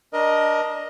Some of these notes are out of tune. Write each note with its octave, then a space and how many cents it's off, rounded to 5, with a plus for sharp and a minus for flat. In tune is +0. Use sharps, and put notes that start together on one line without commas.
D4 +0 A#4 +25 D#5 +0